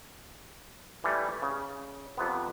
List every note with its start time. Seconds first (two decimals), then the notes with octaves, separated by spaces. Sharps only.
1.04 E3 G3 A3
1.42 C#3
2.17 F2 C3 B3